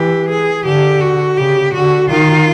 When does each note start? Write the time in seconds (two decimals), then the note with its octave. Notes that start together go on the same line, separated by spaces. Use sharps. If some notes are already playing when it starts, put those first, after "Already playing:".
Already playing: E3 G4
0.29 G#4
0.65 D3 G4
1.01 F#4
1.37 C#3 G4
1.73 D3 F#4
2.09 D#3 F4